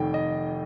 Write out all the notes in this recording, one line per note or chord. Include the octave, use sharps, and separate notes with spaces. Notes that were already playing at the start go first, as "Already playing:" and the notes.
Already playing: F1 F2 D#3 G5
D#5